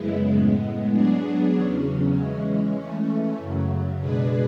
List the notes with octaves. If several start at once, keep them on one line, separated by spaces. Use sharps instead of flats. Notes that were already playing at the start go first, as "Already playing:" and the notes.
Already playing: F#2 C#3 G#3 B3 E4
A2 G#3 B3
F#3 B3 D4 G#4
E2 C#3 F#3 C#4
E3 G#3 C#4
E3 A3 C#4
F#2 C#3 F#3
B2 G#3 D4 G#4 B4